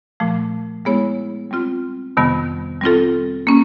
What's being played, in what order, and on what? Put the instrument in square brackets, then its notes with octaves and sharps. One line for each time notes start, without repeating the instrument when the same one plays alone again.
[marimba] A#2 F3 A3
G#3 B3 E4 G#4 C#5
G3 C4 F4
F2 C3 D#3 G3 B3
G3 C4 F4 A4
A#3 C#4